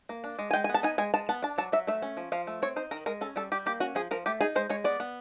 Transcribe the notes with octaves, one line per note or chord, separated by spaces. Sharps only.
A#3
D4
G#3
G#5
G#3 G5
G#5
B3
A5
D#4 G#5
G#3 G#5
G#3 A5
B3 A5
D4 A5
F#3 A5
F#3 E5
A3 E5
C#4
F3
F3 F5
A3
C4 C#5
D#4 C5
D#3 A#4
G#3 A#4
C#4 A4
G3 A4
G3 G4
A#3 G4
C#4 F#4
F3 G#4
F3 A#4
A3 G4
D#4 G#4
G#3 C5
G#3 C#5
B3 D5
B3